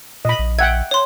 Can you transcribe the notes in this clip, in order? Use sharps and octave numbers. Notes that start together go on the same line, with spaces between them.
A#2 D#5 B5
A#1
E5 F#5 G5 G#6
C#5 C6